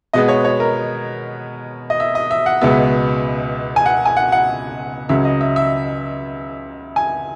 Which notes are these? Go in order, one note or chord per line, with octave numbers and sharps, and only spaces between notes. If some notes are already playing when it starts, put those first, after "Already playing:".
B2 G#3 B3 D#5
C#5
C#5
A#4
D#5
E5
D#5
E5
F#5
C#2 B2 G#3 B3 E5
G#5
F#5
G#5
F#5
F#5
C#2 C#3 F#3 E5
D#5
E5
E5
G#5